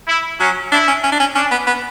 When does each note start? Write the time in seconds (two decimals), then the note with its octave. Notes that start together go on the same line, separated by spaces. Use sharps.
0.08 E4
0.40 F#3 C#4
0.71 D4 E4
0.88 C#4
1.04 C#4
1.12 D4
1.20 C#4
1.35 C#4 D4
1.51 B3
1.67 B3